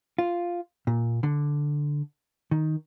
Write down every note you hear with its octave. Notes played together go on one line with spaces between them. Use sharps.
F4
A#2
D3
D#3